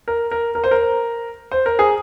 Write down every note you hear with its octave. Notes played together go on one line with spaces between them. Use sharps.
A#4
A#4
A#4
C5
A#4
C5
A#4
G#4